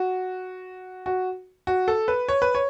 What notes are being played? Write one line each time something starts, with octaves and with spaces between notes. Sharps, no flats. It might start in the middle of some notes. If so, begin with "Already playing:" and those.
Already playing: F#4
F#4
F#4
A4
B4
C#5
B4
C#5